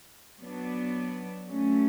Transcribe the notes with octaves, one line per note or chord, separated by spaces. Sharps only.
F#3 B3 D4
F#3 A3 C#4